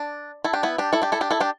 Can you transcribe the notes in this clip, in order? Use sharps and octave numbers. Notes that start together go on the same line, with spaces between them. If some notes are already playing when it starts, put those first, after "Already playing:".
Already playing: D4
E4 A4
D4 G4
B3 E4
D4 G4
E4 A4
D4 G4
E4 A4
D4 G4
E4 A4
D4 G4